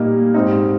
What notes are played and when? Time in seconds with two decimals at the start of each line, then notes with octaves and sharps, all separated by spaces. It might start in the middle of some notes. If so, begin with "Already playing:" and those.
Already playing: A#2 G3 A#3 D#4
0.34 G#2 G3 C4 D#4